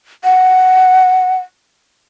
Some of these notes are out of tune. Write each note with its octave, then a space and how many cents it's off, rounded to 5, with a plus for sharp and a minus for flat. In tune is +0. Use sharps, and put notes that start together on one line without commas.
F#5 +5